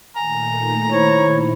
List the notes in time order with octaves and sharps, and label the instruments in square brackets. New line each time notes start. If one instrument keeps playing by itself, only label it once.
[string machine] A#2 D#3 A3 [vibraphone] G#5 [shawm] A#5
[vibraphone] E4 C5 B5 [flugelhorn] C#5